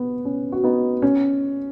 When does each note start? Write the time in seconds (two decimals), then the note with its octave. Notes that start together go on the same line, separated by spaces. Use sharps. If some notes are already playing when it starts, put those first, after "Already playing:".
Already playing: B3
0.25 C#4
0.52 F#4
0.64 B3 D#4
1.02 C#4